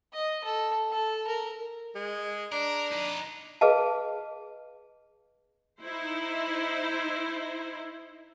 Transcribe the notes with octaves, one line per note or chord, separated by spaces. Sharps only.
D#5
A4
A4
A#4
G#3
D4 A#4
D#4 B4
G#4 B4 D#5 F5 A5
D#4 E4 C5